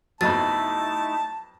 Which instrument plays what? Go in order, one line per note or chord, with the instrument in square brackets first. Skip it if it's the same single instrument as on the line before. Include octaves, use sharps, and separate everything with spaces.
[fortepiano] F2 B2 F#3 [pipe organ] A3 D#4 E4 [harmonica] A5 [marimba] A6